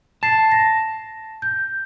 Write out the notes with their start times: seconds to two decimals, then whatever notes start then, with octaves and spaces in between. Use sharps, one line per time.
0.23 A5 A6 C7
0.52 A#6
1.42 G6